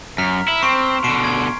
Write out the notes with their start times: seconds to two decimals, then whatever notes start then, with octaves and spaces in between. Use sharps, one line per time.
0.18 F#2 A#5 F6 B6
0.48 E4
0.63 C4 C6 C#6 F7
1.04 B2 D3 C7 D7
1.20 G#5 G#6